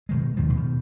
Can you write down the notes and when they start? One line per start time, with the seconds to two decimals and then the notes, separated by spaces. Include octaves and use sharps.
0.09 B2 D#3 G#3
0.37 D#2 G#2 D#3 F3
0.55 B2 D#3